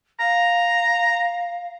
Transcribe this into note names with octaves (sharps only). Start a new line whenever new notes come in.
F5 A#5